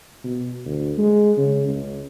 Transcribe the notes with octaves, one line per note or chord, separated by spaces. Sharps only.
B2
D2
G#3
C#3
C#2